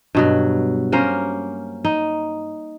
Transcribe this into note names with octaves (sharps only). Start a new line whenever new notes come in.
G2 B2 F#3
A#3 C#4 A#4 C5
D#4